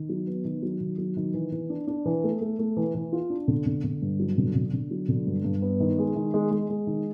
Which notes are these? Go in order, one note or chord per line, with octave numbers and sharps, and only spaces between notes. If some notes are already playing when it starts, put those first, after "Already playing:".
Already playing: D#3
F#3
B3
D#3
F#3
D#3
F#3
D#3
E3
E3
D4
D4
E3
A3
A3
A3
E3
E3
F4
D4
D3
D3
D3
G2
F#3
D3
D3
D3
F#3
D3
G2
G2
B3
D#3
G#3
D#3
G#3
G#3
G#3
D#3